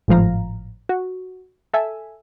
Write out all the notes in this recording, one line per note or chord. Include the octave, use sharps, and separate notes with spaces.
G#1 A2 F3 F5 A#5
F#4
A4 E5 G#5